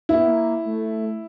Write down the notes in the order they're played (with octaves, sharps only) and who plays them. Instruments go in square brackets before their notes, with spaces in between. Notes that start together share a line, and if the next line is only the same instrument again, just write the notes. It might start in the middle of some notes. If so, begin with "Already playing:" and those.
[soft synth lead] A#3 [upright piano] E4
[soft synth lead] B3
A#3
A3